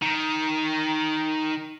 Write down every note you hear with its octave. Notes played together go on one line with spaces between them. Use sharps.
D#3